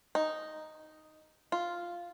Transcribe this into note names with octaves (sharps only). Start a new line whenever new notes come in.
D#4
F4